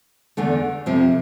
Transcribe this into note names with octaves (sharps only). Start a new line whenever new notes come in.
E2 D3 A3
F2 C3 F3 C4